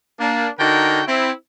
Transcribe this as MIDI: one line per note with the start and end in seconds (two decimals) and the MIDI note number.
0.20 0.48 58
0.20 0.48 62
0.59 1.02 50
0.59 1.02 63
0.59 1.02 66
0.59 1.02 70
0.59 1.02 79
1.07 1.31 60
1.07 1.31 64